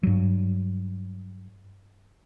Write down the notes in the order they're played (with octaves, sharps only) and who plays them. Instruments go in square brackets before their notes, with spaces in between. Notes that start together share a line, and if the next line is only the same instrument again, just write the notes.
[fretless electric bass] G2 F#3